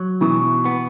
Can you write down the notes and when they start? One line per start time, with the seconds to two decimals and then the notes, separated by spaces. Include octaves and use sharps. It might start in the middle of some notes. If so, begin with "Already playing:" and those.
Already playing: F#3
0.21 B2 E3
0.65 B3